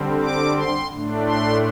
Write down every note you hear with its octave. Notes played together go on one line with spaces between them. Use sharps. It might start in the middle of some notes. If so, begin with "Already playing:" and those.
Already playing: D3 G3 C4
D6
C6
A2 A3 D4
C6